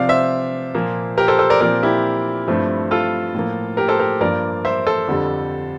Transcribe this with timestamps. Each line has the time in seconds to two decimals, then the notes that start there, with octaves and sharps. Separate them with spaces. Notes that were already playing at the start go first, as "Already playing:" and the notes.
Already playing: C3 F3 C4 D5 F5
0.09 C5 E5
0.75 A#2 F3 A#3
1.18 G4 A#4
1.28 A4 C5
1.39 A4 C5
1.50 A#4 D5
1.61 A#2 F3 C4 A#4 D5
1.83 E4 G4
2.48 G2 F3 A3 C4
2.91 F4 A4
3.34 A2 F3 A#3
3.77 G4 A#4
3.88 A4 C5
3.99 G4 A#4
4.21 G2 F3 A#3 A#4 D5
4.65 C5 E5
4.87 A4 C5
5.08 F2 D3 G3